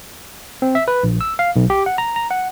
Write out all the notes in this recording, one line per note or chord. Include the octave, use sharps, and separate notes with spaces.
C4
E5
B4
A#1
E6
F5
B1
G4
F#5
A#5
A#5
F#5